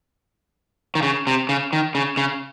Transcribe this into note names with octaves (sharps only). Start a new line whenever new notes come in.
D#3
C#3
C3
C#3
D#3
C#3
C#3